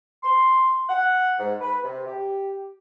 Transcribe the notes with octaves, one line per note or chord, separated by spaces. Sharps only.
C6
F#5
G#2
B4
C3
G4